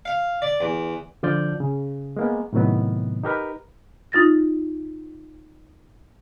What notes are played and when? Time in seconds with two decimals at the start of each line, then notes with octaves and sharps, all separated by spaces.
0.05 F5
0.42 D5
0.61 E2
1.23 D3 F3 F4 D5 G6
1.60 C#3
2.17 G#3 A#3 B3
2.53 A2 C3 D#3 F#3 B3
3.24 D#4 G4 A#4 B4
4.12 D#4 F4 A6 A#6